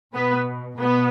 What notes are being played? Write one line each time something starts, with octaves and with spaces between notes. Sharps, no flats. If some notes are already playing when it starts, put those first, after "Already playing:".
B2 B3 B4
B2 B3 B4